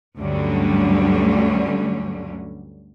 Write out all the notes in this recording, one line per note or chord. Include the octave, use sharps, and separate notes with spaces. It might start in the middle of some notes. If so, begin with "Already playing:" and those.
D2 G2 D3 F#3 G3 C#4